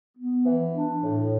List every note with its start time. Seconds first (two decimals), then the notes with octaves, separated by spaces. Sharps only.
0.17 B3
0.46 E3
0.74 D4
1.04 A2